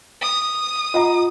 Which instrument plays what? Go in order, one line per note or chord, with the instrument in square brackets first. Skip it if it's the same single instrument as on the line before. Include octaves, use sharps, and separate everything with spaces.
[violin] D#6
[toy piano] F4 F#5 [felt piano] D#5 A#5